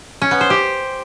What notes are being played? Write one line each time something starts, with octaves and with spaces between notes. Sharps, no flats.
C#4
B3
C5
G4